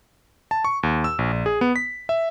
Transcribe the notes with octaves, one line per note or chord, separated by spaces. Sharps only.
A5
C#6
D#2
E6
A#1
A#1
G#4
B3
B6
E5